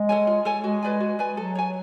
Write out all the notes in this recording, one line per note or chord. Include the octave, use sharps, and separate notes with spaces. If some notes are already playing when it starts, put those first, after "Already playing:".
Already playing: G#3
A4 C#5 G#5
F4
A4 C#5 G#5
G#3 F#4
B4 D5 G#5
F#4
B4 D5 G#5
F#3 A4
C#5 G#5